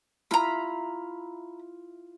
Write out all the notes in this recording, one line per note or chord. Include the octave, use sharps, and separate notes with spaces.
E4 F4 A#5 B5